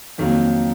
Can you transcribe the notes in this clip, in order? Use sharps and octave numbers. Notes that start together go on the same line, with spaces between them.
F2 D#3 F#3 A#3